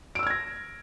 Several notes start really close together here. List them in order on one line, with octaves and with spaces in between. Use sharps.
D7 E6 F6 G#6 A#6